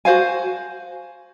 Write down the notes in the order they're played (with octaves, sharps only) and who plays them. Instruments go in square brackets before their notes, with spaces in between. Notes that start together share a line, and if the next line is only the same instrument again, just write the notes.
[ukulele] F#4 C5 F5 G#5